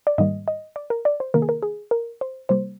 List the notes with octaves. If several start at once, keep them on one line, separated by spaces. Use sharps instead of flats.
D5
G#2 D#3 G3 A#3 D#5
D#5
D5
A#4
D5
C5
C3 D#3 A#3 A#4
G#4
A#4
G#4
A#4
C5
C3 G3 A#3 C5